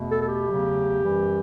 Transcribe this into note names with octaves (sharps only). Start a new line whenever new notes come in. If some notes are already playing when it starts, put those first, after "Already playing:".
Already playing: E2 B2 A3
A4
A4
G4
E2 C#3 F#3 A3
F#2 E3 G3